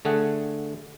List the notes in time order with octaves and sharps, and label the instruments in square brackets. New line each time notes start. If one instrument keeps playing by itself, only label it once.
[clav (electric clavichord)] D3 A3 G#4 F#5